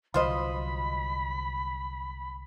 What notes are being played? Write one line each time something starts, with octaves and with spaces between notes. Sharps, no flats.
C2 D3 F#3 F4 C5 D#5 B5